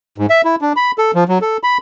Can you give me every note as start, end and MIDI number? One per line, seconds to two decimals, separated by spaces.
0.18 0.26 44
0.30 0.41 76
0.45 0.56 64
0.61 0.73 62
0.76 0.91 83
0.98 1.11 69
1.15 1.24 53
1.28 1.39 54
1.42 1.57 69
1.63 1.78 83